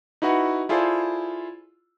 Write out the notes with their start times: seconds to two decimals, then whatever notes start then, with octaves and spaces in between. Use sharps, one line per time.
0.22 D#4 E4 F#4 B4 F#5
0.69 E4 F4 G#4 A4 C5 D5